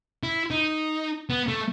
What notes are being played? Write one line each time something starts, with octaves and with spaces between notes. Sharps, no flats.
E4
D#4
B3
A3